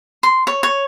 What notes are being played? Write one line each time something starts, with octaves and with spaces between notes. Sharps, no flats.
C6
C#5
C#5